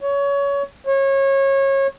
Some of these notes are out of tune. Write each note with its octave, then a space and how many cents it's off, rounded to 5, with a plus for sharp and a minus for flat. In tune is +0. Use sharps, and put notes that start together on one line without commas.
C#5 +20
C#5 -25